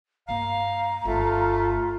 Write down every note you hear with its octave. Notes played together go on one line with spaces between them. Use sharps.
G2 A#3 F5 A#5
G1 A3 F4